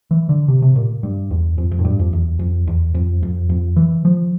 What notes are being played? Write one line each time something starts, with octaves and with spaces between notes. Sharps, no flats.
E3
D3
C3
C3
A#2
G2
E2
F2
F2
A2
G2
F2
E2
F2
E2
F2
F2
F2
E3
F3